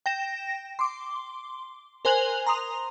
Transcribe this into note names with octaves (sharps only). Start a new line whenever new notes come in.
G5 A#6 E7
C6 D6
A#4 C5 G#5 F#6 F7 F#7
A#5 C6 D#6 F7